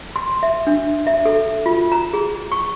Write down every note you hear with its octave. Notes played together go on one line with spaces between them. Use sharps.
C6
E5
D4
E5
A4
F4
A#5
G#4
C#6